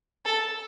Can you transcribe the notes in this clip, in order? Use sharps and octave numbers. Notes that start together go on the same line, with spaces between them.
A4